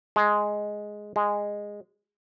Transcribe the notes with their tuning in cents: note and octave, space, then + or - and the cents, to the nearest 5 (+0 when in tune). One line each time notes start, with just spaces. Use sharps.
G#3 +5
G#3 -10